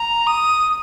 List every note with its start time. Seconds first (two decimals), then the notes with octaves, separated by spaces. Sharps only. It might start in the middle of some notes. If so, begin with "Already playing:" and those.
Already playing: A#5
0.27 D#6